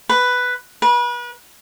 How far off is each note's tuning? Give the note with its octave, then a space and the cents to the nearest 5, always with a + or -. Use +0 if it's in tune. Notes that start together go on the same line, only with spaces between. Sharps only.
B4 +5
B4 -35